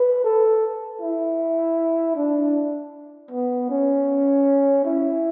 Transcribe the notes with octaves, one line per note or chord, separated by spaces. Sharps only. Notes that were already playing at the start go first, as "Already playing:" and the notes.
Already playing: B4
A4
E4
D4
B3
C#4
E4